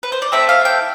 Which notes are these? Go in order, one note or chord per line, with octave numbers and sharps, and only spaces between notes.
B4
C5
D5
A3 C4 E4 A4 E5
F5
G5